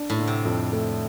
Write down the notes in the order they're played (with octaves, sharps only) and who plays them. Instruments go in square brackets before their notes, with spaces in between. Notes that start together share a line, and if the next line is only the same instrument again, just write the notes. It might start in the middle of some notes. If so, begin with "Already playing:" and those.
Already playing: [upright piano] D4
[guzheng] A2
[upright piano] D3
[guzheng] C3
[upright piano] F2
A3